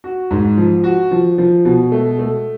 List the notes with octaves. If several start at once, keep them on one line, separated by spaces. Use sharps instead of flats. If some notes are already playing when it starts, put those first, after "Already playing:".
F#4
G#2
F3
F#4
F3
F3
B2
A3
A3